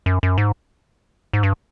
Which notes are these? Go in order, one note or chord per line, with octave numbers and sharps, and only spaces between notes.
F#2
F#2
G#2
G#2
G2